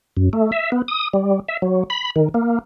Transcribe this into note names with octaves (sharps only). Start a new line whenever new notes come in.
F#2
A3
E5
B3
D#6
G3
E5
F#3
B5
D#3
A#3